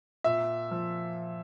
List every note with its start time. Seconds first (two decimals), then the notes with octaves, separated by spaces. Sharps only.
0.24 A#2 E5
0.71 F3